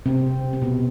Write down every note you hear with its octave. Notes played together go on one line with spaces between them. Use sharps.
C3 C4
C4
B2 B3